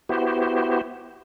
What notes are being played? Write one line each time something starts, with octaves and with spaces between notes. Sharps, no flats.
B3 E4 F#4 G4 C5